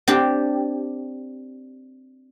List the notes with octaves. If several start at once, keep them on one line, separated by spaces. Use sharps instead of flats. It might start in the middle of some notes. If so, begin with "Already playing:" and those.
C4 D4 G4